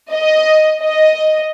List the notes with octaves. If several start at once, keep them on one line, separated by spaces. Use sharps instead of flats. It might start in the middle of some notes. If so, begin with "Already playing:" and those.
D#5
D#5